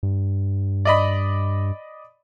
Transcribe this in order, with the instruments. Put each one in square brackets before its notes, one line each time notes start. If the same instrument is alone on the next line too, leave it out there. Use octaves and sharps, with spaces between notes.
[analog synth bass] G2
[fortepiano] D5 D#5 B5